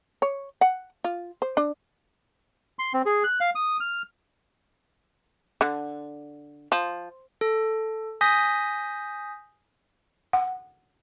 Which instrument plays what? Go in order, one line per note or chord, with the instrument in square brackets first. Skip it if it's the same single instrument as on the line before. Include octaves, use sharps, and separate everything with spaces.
[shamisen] C#5
F#5
F4
C5
D4
[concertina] C6
C4
G#4
F#6
F5
D#6
F6
[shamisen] D3
F3
[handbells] A4
G#5 D#6 G6 A#6 B6
[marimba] F#5